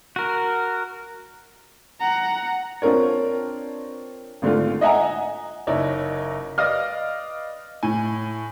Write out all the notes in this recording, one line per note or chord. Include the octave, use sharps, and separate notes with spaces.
F#4 A#4
F#5 A#5
C4 D4 F4 A#4 C#5
G#1 D3 A3 F4
D#5 E5 F#5 G#5 A#5
F#1 D#4 E4 C#5 D5
B4 D5 D#5 F5 D#6 F6
A2 G#5